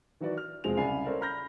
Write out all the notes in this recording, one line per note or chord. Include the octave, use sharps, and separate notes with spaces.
D#3 E3 F#3 F#4 B4 D5
F6
E1 F3 G#3 C4 G#4 F7
C2 C#3 D5 G#5 B5 C7
C#4 A4 A#4 C5 D5
A#5 B5 F6 G6 A#6